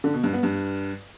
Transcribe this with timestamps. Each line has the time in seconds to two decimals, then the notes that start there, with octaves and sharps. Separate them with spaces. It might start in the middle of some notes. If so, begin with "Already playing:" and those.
0.04 D3
0.14 B2
0.24 G2
0.33 B3
0.43 G2